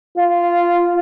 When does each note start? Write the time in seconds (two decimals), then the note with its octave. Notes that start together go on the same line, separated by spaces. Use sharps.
0.17 F4